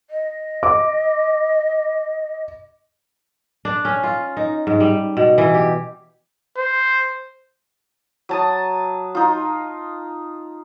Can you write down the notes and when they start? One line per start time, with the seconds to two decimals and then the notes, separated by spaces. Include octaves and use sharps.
0.10 D#5
0.63 D6
3.65 D4
3.85 C#4
4.03 F4
4.37 D#4
4.67 G#2
4.80 G3
5.17 B2
5.38 E3
5.54 G4
6.58 C5
8.29 F#3 A5 D#6
9.15 D#4 F4